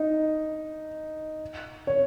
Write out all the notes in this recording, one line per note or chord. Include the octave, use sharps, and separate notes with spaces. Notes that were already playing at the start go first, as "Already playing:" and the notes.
Already playing: D#4
C#5